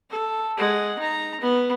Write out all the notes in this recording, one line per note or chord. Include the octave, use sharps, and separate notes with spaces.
A4
G#3 F#5
D#4 A#5
B3